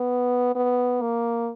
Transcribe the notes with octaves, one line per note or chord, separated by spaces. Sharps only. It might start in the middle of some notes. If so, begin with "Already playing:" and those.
Already playing: B3
B3
A#3